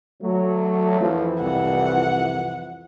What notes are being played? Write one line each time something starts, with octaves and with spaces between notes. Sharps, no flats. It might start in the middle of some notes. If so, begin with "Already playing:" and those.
F#3 A3
F2 E3 F3
C2 F#5